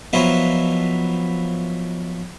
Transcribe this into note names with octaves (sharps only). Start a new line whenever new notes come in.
F3 F#3 B3 D#4 E4